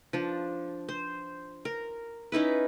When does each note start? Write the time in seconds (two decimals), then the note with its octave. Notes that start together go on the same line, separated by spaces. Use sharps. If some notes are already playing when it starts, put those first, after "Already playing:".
0.13 F3 D4
0.89 C5
1.65 A#4
2.32 C#4 D#4 E4 B4